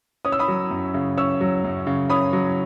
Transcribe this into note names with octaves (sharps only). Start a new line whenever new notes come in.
C#4 D#6
E6
B5 D#6
F#3
F#2
C#3
C#4 C#6 E6
F#3
F#2
C#3
C#4 B5 D#6
F#3